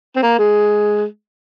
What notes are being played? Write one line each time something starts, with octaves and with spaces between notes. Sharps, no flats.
C4
A#3
G#3